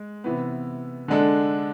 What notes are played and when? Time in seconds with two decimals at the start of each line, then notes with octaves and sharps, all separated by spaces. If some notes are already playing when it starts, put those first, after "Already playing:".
Already playing: G#3
0.24 C3 E3 B3
1.08 D3 G#3 D4 A4